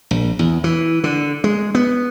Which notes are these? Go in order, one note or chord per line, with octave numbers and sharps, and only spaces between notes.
A#1
E2
E3
D3
G#3
B3